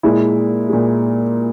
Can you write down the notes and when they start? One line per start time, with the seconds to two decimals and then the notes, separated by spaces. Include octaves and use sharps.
0.03 A#2 G#3 E4
0.69 A#2 G#3